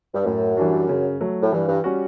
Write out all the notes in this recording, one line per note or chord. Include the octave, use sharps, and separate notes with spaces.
G2
F#2 A2
E3 G3 D4 F#4
C#3
F#3 A3
A2
G2 E3
G2
G3 C#4 F#4